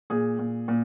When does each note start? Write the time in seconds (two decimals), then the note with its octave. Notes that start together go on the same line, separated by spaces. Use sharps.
0.10 A#2 G#4
0.39 A#2
0.68 A#2